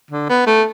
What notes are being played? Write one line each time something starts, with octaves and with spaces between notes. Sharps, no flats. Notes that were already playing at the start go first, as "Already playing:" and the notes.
D3
B3
A3